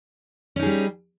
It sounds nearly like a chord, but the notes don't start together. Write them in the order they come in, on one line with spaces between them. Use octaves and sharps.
C#4 D#4 G#4 G3